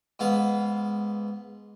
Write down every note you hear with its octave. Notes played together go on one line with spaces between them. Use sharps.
G#2 B3 F5